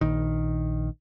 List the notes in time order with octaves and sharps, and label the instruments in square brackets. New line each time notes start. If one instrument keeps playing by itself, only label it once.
[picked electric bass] A#1 D#3